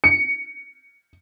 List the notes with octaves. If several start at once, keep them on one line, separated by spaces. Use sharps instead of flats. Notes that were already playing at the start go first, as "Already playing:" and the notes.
C#7